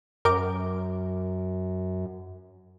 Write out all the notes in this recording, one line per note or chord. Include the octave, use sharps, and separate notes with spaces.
F#2 A#4 G5 D6